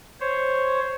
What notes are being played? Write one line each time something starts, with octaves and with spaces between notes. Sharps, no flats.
C5 C#5